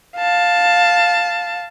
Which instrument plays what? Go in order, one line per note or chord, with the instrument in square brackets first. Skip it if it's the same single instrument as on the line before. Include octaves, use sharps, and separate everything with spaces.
[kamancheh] F5 A5